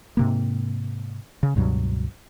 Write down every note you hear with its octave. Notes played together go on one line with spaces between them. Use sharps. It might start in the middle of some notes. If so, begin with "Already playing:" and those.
G#2 C3 A#3
C#3
C#2 G2 B2 F#3